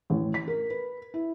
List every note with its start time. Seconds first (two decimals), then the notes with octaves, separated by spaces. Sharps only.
0.10 A1
0.34 B6
0.48 A#4
0.70 B4
1.14 E4